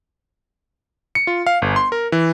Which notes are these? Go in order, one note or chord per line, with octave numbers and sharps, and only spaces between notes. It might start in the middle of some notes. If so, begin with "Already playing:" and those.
C#7
F4
F5
G1
C6
A#4
E3